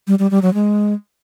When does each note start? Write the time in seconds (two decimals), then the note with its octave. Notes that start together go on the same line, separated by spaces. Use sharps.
0.07 G3
0.19 G3
0.31 G3
0.42 F#3
0.54 G#3